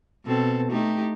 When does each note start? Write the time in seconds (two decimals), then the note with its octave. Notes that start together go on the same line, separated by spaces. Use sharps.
0.25 B2 C4 A4
0.72 A3 D#4 G4